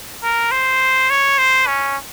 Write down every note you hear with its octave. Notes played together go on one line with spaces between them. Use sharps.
A#4
C5
C#5
C5
C#4